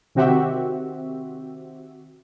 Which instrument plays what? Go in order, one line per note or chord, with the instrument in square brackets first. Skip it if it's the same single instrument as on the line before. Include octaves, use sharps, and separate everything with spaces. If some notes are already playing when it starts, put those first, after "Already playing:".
[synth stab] C3 D#3 C4 F#4 G4 E5